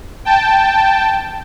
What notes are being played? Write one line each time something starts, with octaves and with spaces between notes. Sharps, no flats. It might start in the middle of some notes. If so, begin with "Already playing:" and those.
G5 A5